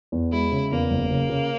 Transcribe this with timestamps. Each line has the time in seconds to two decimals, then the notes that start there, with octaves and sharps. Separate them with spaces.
0.12 E2
0.32 G#3 E4
0.52 C#3
0.71 E2 A#3
0.91 F#1
1.11 C#3
1.29 C#3